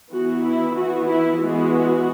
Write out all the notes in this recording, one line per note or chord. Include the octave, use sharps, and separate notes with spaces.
E3 B3 F#4
E4
E3 B3 F#4
E4
E3 G#3 B3 F#4